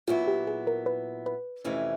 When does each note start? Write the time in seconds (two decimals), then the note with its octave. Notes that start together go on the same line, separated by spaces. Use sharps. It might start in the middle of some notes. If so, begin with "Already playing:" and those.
0.07 A#2 F#3 B3 E4 F4
0.28 G4
0.47 G#4
0.67 A#4
0.86 B4
1.26 B4
1.64 F2 C3 E3 A3 C#4